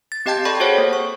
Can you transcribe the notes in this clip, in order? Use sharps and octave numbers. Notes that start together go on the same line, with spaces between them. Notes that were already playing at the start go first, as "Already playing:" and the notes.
A6
C4 G4 D#5 G5 A5 G6
A4 D5 G5 B5 C#6
F#4 G#4 C5 C#5 F#5
A#3
C#6